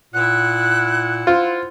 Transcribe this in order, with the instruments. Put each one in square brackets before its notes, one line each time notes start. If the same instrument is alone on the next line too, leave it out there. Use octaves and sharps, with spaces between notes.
[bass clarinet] A#2 [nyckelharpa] E4 F#5 [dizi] F#6
[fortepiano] F4 [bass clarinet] C5